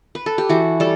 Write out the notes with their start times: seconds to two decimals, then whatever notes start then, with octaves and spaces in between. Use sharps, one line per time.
0.15 B4
0.26 A4
0.38 G4
0.49 E3 F#4
0.80 G3 A4